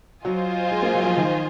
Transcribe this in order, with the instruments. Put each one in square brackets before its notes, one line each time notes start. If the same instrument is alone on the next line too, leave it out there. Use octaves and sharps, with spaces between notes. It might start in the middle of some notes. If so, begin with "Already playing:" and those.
[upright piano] F#3 [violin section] F4 C5 D#5 G#5
[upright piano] G#3
A#3
F#3
F3
D#3